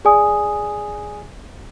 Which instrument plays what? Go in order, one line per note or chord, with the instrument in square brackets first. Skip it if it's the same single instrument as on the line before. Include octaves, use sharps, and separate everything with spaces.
[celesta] G#4 D5 G#5 D#6